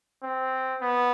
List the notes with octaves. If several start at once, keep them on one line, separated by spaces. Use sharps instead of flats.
C4
B3